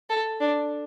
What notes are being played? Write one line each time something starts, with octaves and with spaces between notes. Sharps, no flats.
A4
D4